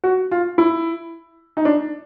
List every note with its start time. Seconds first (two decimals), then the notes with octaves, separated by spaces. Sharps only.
0.04 F#4
0.31 F4
0.58 E4
1.57 D#4
1.65 D4